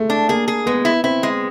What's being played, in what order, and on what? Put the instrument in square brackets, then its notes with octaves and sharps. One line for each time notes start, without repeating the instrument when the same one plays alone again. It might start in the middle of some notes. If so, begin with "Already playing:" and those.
Already playing: [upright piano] G#3 A3
[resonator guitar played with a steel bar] D4
[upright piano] A#3 [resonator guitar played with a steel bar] G#4
[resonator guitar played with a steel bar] G#4
[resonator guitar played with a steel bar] G#3 [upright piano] B3
[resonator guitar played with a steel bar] E4
[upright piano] C4 [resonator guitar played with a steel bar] E4
[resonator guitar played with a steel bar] G#3